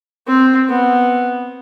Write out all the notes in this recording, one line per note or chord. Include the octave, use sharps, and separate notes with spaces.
C4
B3